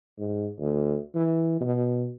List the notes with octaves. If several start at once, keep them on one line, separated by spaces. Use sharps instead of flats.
G#2
D2
E3
B2